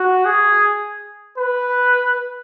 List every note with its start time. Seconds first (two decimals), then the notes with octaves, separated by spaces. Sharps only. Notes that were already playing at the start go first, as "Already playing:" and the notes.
Already playing: F#4
0.25 G#4
1.38 B4